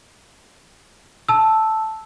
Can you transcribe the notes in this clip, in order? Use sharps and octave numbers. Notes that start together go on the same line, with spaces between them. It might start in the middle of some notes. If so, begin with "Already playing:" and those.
A5 E6